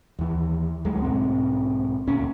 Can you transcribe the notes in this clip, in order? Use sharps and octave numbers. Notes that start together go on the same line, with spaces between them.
D#2 E3
D2 F#3 G#3 A3
B1 G#2 C4
D#1 D2 A#2 C#4